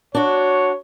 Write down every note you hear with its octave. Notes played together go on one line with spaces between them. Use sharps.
D4 F#4 C#5